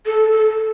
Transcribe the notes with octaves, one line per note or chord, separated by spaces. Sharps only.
A4
A4